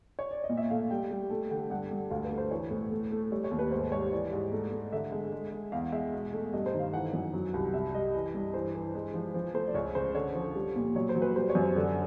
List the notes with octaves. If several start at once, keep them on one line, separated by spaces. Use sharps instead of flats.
C#5
D5
D#5
A#2
E5
A3 F5
G3 G5
G3
A3 A5
D3 G5
G2 F#5
G2
D2 F5
B4
A3
C5
E3 C#5
A2
A3
A3
G3 C#5
C#5
D#2
B4
G#2 C5
G3 C#5
E3 D5
G#2
A3
A3
D3 E5
G#3
G#3
G#3
E2 F5
G#3 E5
B2
A3
G2 D#5
C5
D#3
F5
E3 F#5
F#2
F#3
C2
G3 E5
G3 D#5
E3
G2
E3 C5
E3
G#3
F3
F3
A3 C5
D5
C#2 C#5
C#3 C5
D3 C#5
F3
G3
A#2
F#3 C#5
C5
F#3
B4
G3 C5
C#5
F#2
C5
D3 D5